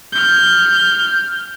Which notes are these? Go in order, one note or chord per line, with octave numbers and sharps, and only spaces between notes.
F6 G6